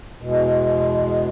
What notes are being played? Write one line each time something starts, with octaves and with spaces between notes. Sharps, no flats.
E2 B2 G#3